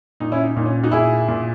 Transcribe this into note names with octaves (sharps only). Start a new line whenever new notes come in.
A#2 D#4
C#4 E4
D#4
A#2 D#4
C#4
D#4 F#4
A#2 E4 G#4
A#2